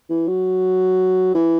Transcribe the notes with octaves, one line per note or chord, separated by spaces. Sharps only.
E3
F#3
E3